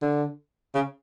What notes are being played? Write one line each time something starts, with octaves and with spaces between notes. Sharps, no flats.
D3
C#3